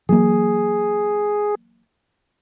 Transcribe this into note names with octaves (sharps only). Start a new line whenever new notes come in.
E3 F#3 A#3 G#4